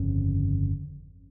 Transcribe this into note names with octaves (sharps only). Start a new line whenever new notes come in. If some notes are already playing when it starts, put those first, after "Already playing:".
Already playing: G1 F2 C#3 C#4